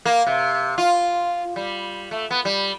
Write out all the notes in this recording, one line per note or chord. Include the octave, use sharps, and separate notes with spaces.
A#3
C3
F4
G3
A3
B3
G3